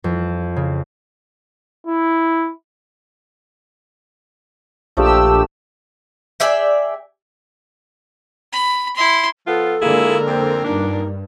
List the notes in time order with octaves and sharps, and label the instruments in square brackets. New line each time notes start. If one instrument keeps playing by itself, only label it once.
[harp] F2
C#3
[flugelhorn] E4
[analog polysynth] A#1 G4 E6 [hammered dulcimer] F3 A3 D4
[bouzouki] G#4 D5 E5 G5
[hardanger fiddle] B5
E4 C6
[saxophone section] F3 B3 F4 [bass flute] A4
[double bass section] D3 G#3 A#3 [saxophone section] E4 F4 G#4 [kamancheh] A#4
[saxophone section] F2 C4
[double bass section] G2 [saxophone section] A#2 D4 [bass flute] D#4